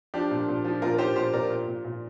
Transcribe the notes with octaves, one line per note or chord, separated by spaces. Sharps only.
F3 D4 G4
A#2
A#2
F3
A#2 F4 A#4
A#4
F3 G4 C5
A#2 G4 C5
A#2 A#4 D5
A#2
A#2
A#2